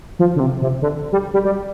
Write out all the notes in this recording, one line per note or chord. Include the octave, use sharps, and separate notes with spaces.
F3
D3
C3
C3
D3
G3
G3
G3